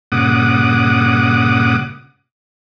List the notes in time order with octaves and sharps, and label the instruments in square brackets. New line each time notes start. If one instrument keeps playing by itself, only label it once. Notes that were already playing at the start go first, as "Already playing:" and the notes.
[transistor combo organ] G2 A#2 C#3 F#5 D6 D#6